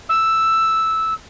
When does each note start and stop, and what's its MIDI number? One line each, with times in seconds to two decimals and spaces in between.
0.09 1.13 88